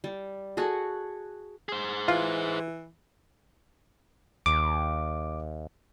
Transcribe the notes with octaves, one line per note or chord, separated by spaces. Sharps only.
G3
F#4 G#4 A4 F#5
G#4 C5
E3 F4
D#2 D6